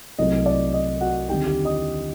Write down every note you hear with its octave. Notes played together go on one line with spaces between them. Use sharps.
C2 C3 F#3 A3 D#5
D5
D#5
F#4 F#5
D#2 D3 G3 C4 D#4 G4 G5
G4 G5
D#5 D#6